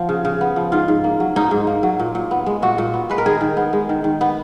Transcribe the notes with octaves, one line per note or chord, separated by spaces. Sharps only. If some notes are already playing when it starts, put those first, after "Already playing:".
Already playing: F3 B3
C#3
C#3
B3
F3
G#2 F4
G#2
A#3
F#3
G#2 D#4
G#2
A#3
F#3
A#2
A#2
B3
G#3
A#2 F#4
A#2
B3
G#3 B4
A#4
D#3 G#4
D#3
B3
G#3
D#3
D#3
B3